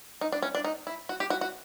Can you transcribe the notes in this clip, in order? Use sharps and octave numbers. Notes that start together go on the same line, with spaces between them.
D#4
D4
C#4
D4
D#4
E4
F#4
G4
F#4
F#4